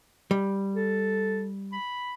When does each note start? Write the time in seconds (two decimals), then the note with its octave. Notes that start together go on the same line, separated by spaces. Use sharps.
0.31 G3
0.76 A4
1.73 B5